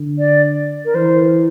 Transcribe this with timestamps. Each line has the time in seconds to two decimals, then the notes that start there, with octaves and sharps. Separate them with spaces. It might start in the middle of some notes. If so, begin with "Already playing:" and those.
Already playing: D3
0.19 D5
0.85 A#4
0.95 E3 C5